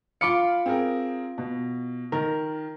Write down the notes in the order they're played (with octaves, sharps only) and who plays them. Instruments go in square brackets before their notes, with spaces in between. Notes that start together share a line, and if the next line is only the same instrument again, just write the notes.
[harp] F4 D6 C#7 [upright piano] F5 B5
[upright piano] C4 G#4 A#4
B2
[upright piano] D#3 [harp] A#4